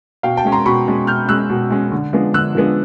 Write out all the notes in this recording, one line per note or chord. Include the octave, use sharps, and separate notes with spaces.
B2 F5 G5
G5 A5
G#3 C#4
A#5 C6
B2 B5 C#6
G#3 C#4
B2 F6 G6
G#3 C#4 E6 F#6
B2
G#3 C#4
D3
F3 G#3 B3 D4
D3 E6 F#6
F3 G#3 B3 D4